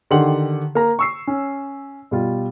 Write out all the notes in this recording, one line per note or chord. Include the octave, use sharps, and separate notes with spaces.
D3 D#3 G4 F#5 C6 F#7
A#3 A#5
C#6 E6 C7
C#4
B2 G3 F4